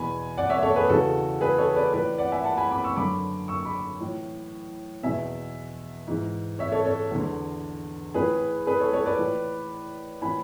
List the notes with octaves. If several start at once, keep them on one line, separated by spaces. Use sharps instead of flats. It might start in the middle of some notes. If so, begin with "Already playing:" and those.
Already playing: E2 B2 G#5 B5
D5 F#5
C#5 E5
A4 C#5
G#4 B4
E2 C#3 E3 F#4 A4
G#4 B4
A4 C#5
B4 D5
A2 E3 B4 D5
D5 F#5
E5 G#5
F#5 A5
G#5 B5
B5 D6
C#6 E6
F#2 D3 B5 D6
C#6 E6
B5 D6
A2 E3
E2 B2 E5 G#5
G#2 E3
C#5 E5
A4 C#5
A4 C#5
E2 D3
A2 E3 G#4 B4
G#4 B4
A4 C#5
A4 C#5
B4 D5
A2 E3
A2 E3 G#5 B5